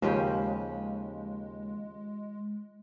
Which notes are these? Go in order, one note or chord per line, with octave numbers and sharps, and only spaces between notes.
D#2 C#3 F3 G#3 C#4 G4